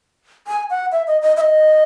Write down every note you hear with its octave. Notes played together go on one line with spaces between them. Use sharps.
G#5
F#5
E5
D#5
D#5
E5
D#5